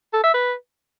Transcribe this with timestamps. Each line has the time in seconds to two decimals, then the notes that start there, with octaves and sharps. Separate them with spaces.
0.13 A4
0.24 E5
0.34 B4